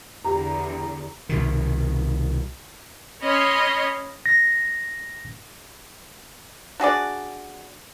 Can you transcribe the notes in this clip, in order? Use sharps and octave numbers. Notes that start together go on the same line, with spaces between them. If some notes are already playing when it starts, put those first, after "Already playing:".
E2 D3 G4 A#5
C2 B2 D#3
C#4 C#5 D#5 B5 C6
A#6
D4 F#4 G#4 D5